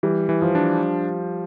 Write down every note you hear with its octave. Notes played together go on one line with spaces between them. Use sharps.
E3 G3
E3
F3
D4